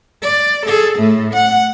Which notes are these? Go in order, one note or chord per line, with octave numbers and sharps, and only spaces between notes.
D5
G#4 A4
A2 A3
F#5